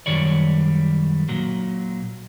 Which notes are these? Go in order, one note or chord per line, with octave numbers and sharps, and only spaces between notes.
F#2 D#3 G3 C#5 D5
A#2 F#3